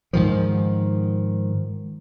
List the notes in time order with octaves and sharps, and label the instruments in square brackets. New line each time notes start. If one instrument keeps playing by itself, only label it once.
[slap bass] G#2 D#3 F3